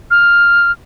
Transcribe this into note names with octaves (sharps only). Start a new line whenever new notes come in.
F6